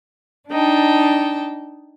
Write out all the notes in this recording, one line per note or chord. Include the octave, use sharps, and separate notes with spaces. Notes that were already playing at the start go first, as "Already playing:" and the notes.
D4 D#4 G5 A5